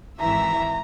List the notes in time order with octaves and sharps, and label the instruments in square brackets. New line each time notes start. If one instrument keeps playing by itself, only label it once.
[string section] G#1 E3 E5 [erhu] A#5